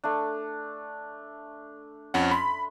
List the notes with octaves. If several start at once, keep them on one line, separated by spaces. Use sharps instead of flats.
A3 D4
F2 C#4 F#5
B5 C6